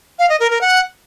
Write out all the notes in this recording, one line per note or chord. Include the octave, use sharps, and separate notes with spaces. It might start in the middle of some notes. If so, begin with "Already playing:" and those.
F5
D#5
A#4
A#4
F#5